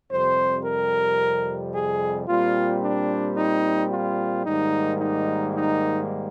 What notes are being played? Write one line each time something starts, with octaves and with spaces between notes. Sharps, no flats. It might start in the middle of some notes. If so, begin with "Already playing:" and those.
F2 C3 G3 C5
A#4
G#4
A#2 G3 C4 F4
D4
D#4
F4
G#2 D#3 G3 A#3 D#4
D#4
D#4